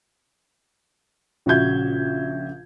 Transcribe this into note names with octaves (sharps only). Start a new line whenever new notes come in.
A#1 C#3 F#4 E5 G6 G#6